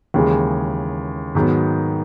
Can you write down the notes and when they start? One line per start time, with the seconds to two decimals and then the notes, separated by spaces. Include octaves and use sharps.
0.14 D#2 C#3 E3 G#3
1.35 G#2 D#3 F#3 B3